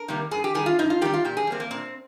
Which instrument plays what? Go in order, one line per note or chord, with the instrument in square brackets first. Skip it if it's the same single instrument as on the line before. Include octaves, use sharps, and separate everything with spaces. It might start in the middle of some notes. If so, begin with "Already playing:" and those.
Already playing: [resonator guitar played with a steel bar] A#4
C3 D#3 G3 A#3
G2 G#4
G4
D#3 G3 G#4
F4
G2 D#4
F4
D#3 G3 G4
F4
A#2 G4
G#4
G3 A#3 C4
A#3
A#2 C4